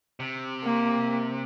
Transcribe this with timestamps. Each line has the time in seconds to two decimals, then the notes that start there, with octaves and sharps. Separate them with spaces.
0.20 C3
0.63 A#3